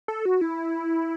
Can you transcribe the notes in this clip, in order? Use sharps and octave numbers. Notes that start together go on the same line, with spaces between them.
A4
F#4
E4